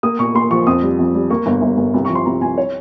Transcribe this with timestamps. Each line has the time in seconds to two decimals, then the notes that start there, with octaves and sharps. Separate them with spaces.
0.03 A#3 D#6
0.19 A#2 C#6
0.35 A#3 C6
0.51 F3 C#6
0.67 F2 D#6
0.83 G3
0.99 F2
1.15 G3
1.30 A#3 C#6
1.46 G1
1.62 G1
1.77 G1
1.94 C2
2.05 C#6
2.09 F3
2.15 C6
2.26 C2 A#5
2.41 C2 G#5
2.58 C#5